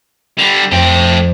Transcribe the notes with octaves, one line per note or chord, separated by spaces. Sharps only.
D3 G3
F2 A3 G5